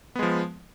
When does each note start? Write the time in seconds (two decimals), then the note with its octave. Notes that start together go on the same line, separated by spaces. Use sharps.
0.15 B3
0.19 G#3
0.23 F3